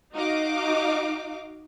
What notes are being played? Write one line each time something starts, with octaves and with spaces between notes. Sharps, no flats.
D#4 F#4 D#5 F5 D6